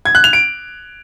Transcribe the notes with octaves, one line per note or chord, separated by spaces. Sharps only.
G#6
F#6
F7
D7